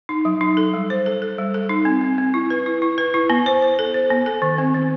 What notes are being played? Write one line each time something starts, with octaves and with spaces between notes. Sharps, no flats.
D#4
F#3
D#4
A4
G3
C5
A4
A4
G3
A4
D#4
C4
C4
C4
E4
B4
E4
E4
B4
E4
B3
C5
C5
A4
C5
B3
A4
D#3
C4
D#3